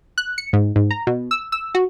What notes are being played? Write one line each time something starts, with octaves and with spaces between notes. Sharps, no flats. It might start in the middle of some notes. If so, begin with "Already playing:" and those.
F#6
C#7
G#2
G#2
A#5
B2
E6
E6
F#4